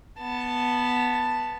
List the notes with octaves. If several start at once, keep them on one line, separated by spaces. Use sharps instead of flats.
B3 A5